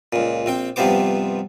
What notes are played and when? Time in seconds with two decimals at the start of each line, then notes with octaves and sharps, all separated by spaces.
0.13 C#2 A#2
0.46 A#1 C4 G5
0.76 G2 C3 F3 B3 C5 D6